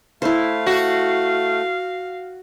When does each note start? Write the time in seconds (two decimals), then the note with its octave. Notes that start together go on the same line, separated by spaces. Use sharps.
0.22 A3 E4 C5 F5
0.66 F#4